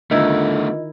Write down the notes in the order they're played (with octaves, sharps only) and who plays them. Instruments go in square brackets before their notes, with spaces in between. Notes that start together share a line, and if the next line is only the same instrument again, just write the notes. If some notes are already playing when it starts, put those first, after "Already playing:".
[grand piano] D3 [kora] D#3 E4 [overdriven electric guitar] A3 B3 [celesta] F4 D#5